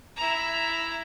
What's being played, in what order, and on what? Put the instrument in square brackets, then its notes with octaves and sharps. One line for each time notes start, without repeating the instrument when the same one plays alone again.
[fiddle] E4 A#5